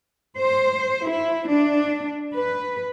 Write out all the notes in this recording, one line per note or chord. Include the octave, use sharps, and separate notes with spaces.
C5
E4
D4
B4